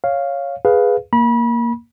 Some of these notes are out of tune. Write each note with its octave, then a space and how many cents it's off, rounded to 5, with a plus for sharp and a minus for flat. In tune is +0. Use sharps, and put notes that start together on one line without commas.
C#5 +0 F5 +0
G#4 +0 B4 +0 F5 +10
A#3 +0 B5 -35